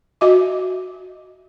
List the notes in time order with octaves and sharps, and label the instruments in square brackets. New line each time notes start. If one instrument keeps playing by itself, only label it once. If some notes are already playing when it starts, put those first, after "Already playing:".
[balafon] F#4 D#5 E5 D6